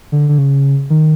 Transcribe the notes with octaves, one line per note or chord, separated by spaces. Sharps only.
D3
D3
C#3
D#3